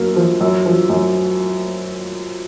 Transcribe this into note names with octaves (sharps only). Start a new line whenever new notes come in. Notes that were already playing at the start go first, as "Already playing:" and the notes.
Already playing: F#2 A#3
F3
F#2
F3
F#2